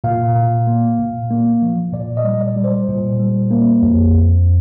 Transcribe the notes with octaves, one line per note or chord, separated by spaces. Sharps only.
A#2 F5
A#2
A#3
A#2
A#3
F3
A#2 D5
D#5
G3
D5
G3
C5
A#2
G3
A#3
F2
F2